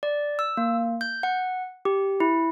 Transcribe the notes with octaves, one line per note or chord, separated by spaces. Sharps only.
D5
E6
A#3
G6
F#5
G4
E4